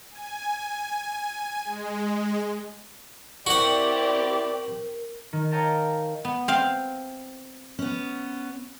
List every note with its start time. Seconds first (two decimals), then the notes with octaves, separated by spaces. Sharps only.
0.11 G#5
1.65 G#3
3.47 C4 E4 F#4 G4 A#4 D5 F#5
5.33 D#3
5.51 C#5 D#5 F5 G5 A5 A#5
6.25 B3
6.48 C4 F5
7.79 B3 C#4